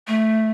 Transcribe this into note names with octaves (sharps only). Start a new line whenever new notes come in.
A3